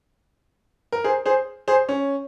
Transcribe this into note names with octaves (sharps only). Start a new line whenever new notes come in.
A#4
G#4 C5
G#4 C5
G#4 C5
C#4